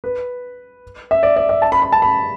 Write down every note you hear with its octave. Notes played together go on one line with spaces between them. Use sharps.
B4
E5
D5
D5
E5
A5
B5
B5
A5
B5